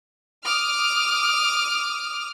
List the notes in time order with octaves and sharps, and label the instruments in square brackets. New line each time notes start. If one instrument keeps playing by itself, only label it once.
[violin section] D6 D#6 F6